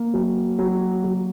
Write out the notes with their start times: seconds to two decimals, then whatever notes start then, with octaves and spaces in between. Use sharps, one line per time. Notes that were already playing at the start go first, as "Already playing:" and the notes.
Already playing: A#3
0.14 F#3
0.59 F#3
1.04 F#3